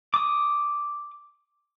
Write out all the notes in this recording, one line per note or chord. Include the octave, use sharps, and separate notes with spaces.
D6 D#6